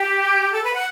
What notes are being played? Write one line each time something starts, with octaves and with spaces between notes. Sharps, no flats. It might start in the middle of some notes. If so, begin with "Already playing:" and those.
Already playing: G4
A4
B4
F#5